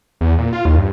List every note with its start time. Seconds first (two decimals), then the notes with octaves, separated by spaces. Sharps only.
0.21 E2
0.38 A#2
0.53 F4
0.65 D#2
0.78 G2